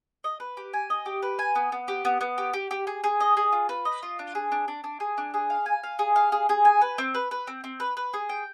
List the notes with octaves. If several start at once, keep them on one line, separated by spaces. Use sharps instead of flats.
D#5
B4
G4
G#5
D#5
G4
B4
G#5
B3
B3
G4
B3
B3
G4
G4
G4
G#4
G#4
D#5
G#4
F4
B4
D#5
F4
D4
G#4
D4
D4
D4
G#4
D4
G#4
F5
G#5
F5
G#4
F5
G#4
G#4
G#5
B4
C4
B4
B4
C4
C4
B4
B4
G#4
G5